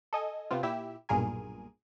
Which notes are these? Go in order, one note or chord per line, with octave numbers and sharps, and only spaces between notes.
A4 D#5 G#5
C3 B3 C4 F4
A#2 E4 G4 E5
B1 G2 A#2 G#4 A#4 G#5